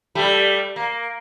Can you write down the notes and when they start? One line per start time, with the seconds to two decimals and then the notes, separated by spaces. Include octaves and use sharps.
0.15 G3 A3
0.76 A#3